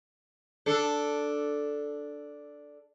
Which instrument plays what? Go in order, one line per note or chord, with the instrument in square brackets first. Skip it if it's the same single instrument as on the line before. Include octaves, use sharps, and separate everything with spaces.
[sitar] D4 A4